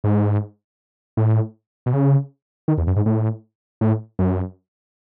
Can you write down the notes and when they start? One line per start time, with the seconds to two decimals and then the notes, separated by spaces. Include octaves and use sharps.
0.04 G#2
1.17 A2
1.86 B2
1.93 C#3
2.68 D#3
2.78 E2
2.87 F#2
2.96 G#2
3.06 A2
3.81 A2
4.19 F#2